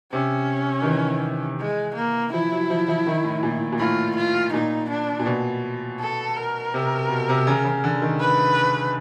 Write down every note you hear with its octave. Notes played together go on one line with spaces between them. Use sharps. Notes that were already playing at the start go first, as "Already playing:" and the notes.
C3 C#4
D#3
E3
G#3
A#3
F3 E4
F#3
F3
F3
D#3
A2
A#2
A#2
A2 F4
F4
A#2 D#4
D4
A#2
B2
A4
A#4
C3
B2
C3
C#3
C#3
D3
D#3
B4